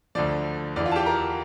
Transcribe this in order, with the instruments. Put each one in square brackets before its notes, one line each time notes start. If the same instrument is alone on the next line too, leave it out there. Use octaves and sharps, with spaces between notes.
[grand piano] D2 D3 F3 D5
E2 E3 D5
F4 F5
A5
G4 G5
A#4 A#5